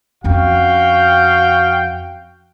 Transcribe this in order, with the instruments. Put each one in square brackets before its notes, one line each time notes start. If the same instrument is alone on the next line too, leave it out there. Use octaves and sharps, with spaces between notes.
[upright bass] F2 C#4 [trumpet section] F#4 F5 G5